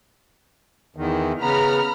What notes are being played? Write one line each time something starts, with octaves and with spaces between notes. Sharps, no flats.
E2 D#3
C#3 B3 A#5 B5 F6